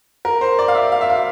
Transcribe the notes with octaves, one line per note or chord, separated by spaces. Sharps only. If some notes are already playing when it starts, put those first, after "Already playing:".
A#4
C5
D5
F5
E5
F5
E5
F5